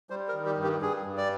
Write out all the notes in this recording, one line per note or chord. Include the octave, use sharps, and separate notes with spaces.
G3 C5
A#4
D#3
G4
G2
G4
G2 G#4
G2
D5